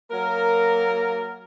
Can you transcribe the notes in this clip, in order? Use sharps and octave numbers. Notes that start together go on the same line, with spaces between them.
F#3 A#3 A#4